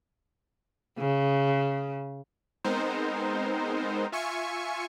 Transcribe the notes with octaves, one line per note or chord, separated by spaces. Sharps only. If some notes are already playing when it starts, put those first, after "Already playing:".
C#3
G#3 B3 C4 D#4 A#4 C5
F4 E5 G#5 C#6 C#7